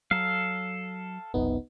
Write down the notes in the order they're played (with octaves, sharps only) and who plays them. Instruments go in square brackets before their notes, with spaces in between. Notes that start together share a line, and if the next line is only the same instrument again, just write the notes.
[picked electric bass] F#3 [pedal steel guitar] A4 F5
[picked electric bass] F#1 C2 F#2 [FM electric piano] B3 D#4